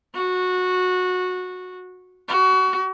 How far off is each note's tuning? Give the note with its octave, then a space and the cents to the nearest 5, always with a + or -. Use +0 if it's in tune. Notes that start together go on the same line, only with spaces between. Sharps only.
F#4 -15
F#4 +25